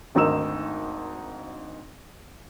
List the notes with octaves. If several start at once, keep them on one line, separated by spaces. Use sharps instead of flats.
G#1 D2 D#3 D#4 E6 E7